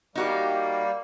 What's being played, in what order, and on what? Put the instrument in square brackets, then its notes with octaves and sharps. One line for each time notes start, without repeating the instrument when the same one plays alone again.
[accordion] G3 A#3 [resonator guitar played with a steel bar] D#4 F#4 G4